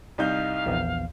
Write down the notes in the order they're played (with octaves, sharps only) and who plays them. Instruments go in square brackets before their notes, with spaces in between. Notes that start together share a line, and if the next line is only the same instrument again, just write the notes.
[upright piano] C2 D#4 G6 [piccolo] F5
[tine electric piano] A#1 E2